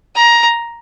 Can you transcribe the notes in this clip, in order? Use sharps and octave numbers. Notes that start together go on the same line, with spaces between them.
A#5